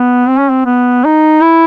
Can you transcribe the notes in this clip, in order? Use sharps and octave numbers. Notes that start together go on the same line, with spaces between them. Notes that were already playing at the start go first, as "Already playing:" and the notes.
Already playing: B3
C4
C#4
C4
B3
D#4
E4